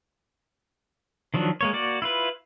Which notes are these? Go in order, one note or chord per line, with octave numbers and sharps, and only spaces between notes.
D#3 F3 F#3 D4
G#3 A#3 C#5
A#3 F#4 D5
E4 F4 B4